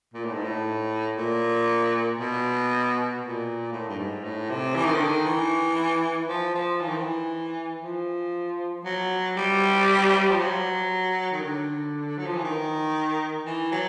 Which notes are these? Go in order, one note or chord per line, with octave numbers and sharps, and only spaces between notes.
A#2
A2
G#2
A2
A#2
B2
A#2
A2
G2
G#2
A2
C3
E3
D#3
D3
D#3
E3
F3
F3
E3
D#3
E3
F3
F#3
G3
F3
F#3
D#3
D3
F#3
F3
E3
D#3
E3
F#3